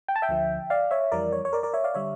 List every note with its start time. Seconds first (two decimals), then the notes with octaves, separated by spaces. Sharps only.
0.08 G5
0.16 A5
0.22 E5 G5
0.29 D2 D3 F3
0.70 D5 F5
0.91 C#5 E5
1.12 F2 E3 G3 A#4 D5
1.33 C#5
1.45 C#5
1.53 A#4 D5
1.63 A#4 D5
1.74 C#5 E5
1.84 D5 F5
1.94 D3 G3 C#5 E5